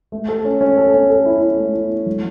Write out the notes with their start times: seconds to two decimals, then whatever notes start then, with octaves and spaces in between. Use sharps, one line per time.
0.12 A3
0.28 A4
0.45 C#4
0.61 C#4
0.77 A4
0.94 C#4
1.10 A4
1.26 E4
1.42 E4
1.58 A3
1.74 E4
1.90 E4
2.06 F#3